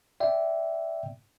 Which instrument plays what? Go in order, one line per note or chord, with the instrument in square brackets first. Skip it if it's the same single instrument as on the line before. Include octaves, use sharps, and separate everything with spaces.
[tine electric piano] D5 E5 G5